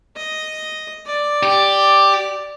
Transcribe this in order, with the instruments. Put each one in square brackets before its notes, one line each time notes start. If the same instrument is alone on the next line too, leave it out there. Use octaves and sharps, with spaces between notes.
[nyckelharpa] D#5
D5
[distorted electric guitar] G4